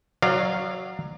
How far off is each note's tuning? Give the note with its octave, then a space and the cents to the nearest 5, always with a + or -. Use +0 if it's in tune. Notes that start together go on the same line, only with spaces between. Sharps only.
F#3 +0 D5 +30 F5 -10